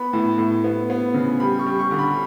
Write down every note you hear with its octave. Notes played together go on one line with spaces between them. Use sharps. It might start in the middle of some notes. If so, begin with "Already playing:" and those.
Already playing: B3 B5
A2
A2
B3
B3
C#3
G3 B5
C#6
G3
C#6
D3
B5